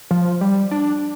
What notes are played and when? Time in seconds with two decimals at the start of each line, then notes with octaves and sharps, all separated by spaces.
0.11 F3
0.41 G3
0.71 D4